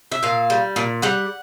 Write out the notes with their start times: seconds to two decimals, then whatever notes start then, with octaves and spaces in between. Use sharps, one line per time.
0.12 E5
0.23 A#2 F5
0.50 G3
0.76 A#2
1.02 G3 F#5